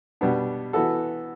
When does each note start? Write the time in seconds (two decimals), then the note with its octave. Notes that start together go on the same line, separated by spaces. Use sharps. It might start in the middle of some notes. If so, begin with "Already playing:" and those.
0.21 B2 G3 B3 D4
0.73 E3 B3 F#4 A4